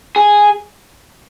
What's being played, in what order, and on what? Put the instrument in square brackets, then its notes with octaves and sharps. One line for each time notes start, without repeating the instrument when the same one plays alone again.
[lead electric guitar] G#4